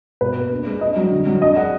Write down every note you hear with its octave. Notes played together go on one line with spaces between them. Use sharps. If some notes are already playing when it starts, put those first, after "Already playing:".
B2 B4
A#3
D4
G#3
D4 D#5
F#3
D3
F#3
D4 D#5
G#3 F#5